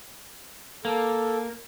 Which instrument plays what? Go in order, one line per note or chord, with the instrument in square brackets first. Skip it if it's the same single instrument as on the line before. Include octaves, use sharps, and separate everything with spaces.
[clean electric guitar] A#3 [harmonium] A4